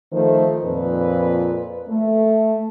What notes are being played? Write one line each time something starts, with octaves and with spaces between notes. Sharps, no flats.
D#3 F3 A3 C5
F2 A#2 B4
A3